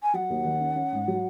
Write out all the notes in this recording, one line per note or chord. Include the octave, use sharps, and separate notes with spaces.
G#5
F#3 F#5
D#2
D#3
C#4
C#4
G#2
F#3